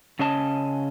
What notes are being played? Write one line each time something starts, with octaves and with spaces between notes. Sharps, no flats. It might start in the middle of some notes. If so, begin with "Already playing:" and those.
C#3 C#4 D#5 A5